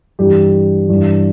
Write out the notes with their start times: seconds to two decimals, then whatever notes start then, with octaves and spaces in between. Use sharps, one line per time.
0.19 G2 E3 G4
0.89 G2 E3